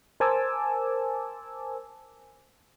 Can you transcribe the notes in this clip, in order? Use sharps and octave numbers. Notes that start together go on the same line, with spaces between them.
A#4 C5 G#5 A5 D6 E6